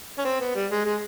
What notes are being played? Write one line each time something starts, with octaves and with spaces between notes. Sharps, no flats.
C#4
C4
B3
G3
G#3
G#3